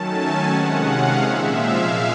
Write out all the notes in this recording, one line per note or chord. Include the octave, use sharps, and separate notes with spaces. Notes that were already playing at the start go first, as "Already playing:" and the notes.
Already playing: D#3 F#3 A3 C#4 A5
G#5
C3 D#3 G#3 C#4 F#5
F5
A#2 F3 G#3 E5
F5